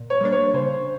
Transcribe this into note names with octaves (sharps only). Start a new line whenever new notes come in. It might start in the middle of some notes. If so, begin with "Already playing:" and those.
Already playing: A#2
C#5
G3 A#3 D4
C#5
C#3 C5